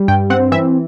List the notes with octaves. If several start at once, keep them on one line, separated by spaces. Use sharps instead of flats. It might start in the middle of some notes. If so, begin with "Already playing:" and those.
Already playing: G3
G2 G5
C4 F#5
E3 E5